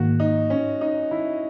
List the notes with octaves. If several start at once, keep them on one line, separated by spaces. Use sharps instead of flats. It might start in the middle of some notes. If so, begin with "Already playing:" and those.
Already playing: G#2 D#3 A#3 F#4
D#4
C#4
D#4
E4